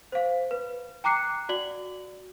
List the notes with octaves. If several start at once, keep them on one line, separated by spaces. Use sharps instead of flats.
C5 F5
B4
G5 A#5 D6 F#6 C7 C#7
F#4 D5 F#7